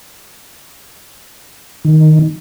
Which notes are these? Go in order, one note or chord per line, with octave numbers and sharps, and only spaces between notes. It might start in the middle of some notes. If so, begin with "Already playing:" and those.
D#3